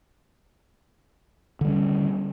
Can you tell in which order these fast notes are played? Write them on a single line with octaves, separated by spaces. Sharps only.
D3 G3 C#4